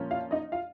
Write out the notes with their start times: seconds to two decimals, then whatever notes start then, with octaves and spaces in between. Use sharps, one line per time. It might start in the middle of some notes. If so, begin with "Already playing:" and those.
Already playing: A#2 F3 A#3 C#4
0.11 F4 F5
0.31 D#4 D#5
0.52 F4 F5